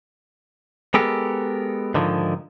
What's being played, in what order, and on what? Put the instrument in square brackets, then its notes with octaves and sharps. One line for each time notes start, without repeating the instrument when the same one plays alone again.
[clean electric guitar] G#3 B3 G4 A4 A#4
G#2 D3 D#3 F3